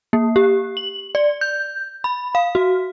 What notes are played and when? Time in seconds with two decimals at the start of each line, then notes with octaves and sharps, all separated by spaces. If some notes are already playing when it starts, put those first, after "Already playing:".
0.13 A#3
0.36 G4
0.77 F#7
1.15 D5
1.41 G6
2.04 B5
2.35 F5
2.55 F#4